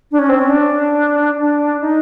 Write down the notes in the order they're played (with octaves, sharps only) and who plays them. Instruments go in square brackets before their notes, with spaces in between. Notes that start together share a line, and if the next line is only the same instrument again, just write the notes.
[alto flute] D4
C#4
C4
C#4
D4
D4
D#4